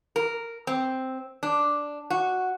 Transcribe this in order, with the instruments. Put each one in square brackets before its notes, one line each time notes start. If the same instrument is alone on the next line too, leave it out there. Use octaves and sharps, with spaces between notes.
[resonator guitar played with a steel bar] A#4
C4
D4
F#4